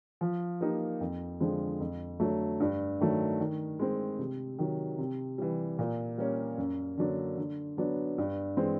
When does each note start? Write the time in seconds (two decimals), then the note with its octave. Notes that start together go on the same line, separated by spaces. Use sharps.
0.21 F3
0.61 A#3 D#4 G4
1.01 F2
1.40 D3 F3 G#3 C4
1.80 F2
2.20 D3 F#3 A3
2.60 G2
3.00 D#3 F#3 A3
3.40 D#3
3.79 G#3 C4
4.19 C3
4.59 D#3 F#3
4.98 C3
5.38 E3 G3
5.79 A#2
6.18 G3 A#3 C#4
6.58 F#2
6.97 D3 F#3 A#3 D4
7.37 D3
7.77 F#3 B3 D4
8.18 G2
8.57 E3 G#3 C4